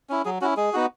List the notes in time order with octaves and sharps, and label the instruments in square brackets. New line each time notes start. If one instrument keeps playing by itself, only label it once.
[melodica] C#4 E4
F#3 G#4
C#4 E4 F#4
G#3 G#4
B3 D#4 F#4